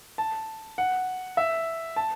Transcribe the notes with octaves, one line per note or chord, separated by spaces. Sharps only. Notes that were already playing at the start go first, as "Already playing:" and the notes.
A5
F#5
E5
A5